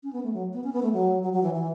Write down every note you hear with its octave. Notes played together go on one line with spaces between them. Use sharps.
C#4
B3
A3
F#3
B3
C#4
B3
A3
F#3
F#3
F#3
E3
E3